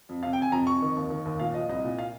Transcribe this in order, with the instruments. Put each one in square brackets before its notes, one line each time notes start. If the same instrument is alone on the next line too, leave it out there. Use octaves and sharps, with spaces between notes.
[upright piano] F2
C3 F5
G5
C3 G#5
F2 A#5
F2 C#6
D#3
D#2
D#3
D#2
A#2 F5
F3 D#5
C2 D#5
A#2
F5